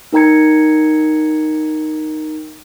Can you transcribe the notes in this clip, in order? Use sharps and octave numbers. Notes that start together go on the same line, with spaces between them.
D#4 A#4 G5 A#5 G#6 C#7